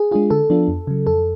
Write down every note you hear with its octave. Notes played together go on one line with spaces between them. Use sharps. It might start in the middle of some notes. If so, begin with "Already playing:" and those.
Already playing: G#4
G#3 D4 F4 G#4
D3 A4
F3 B3 D4 F4
F2
C#3 F#3
F2 A4